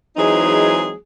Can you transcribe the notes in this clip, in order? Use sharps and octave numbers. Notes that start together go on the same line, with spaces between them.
E3 F#3 G#3 C4 D#4 G#4